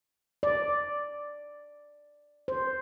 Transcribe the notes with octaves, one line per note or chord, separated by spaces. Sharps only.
D5
C5